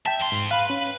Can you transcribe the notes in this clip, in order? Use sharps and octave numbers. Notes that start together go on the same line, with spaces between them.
E5 G5 A5
F2 C6
G#2
B4 F5 B5
C#4